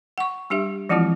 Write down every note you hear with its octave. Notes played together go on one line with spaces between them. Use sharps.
F#5 C#6
G3 D4 G4 E5
E3 F3 G#3 C4 E4 F4